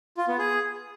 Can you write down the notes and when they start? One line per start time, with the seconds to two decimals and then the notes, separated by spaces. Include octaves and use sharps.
0.17 F4
0.28 B3
0.38 G#4